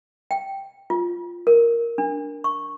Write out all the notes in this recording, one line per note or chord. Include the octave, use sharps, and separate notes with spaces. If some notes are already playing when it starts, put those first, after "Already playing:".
G5
F4
A#4
D4
C#6